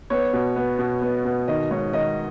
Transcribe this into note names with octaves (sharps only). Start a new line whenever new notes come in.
B3 C#5
B2
B3
B2
B3
B2
D#3 D#5
G#2 C#5
D#3 D#5